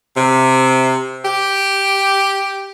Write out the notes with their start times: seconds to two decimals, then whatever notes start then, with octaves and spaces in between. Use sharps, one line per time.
0.17 C3
1.25 G4